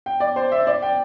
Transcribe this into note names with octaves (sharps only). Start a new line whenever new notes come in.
G5
D5
C5
E5
D5
G5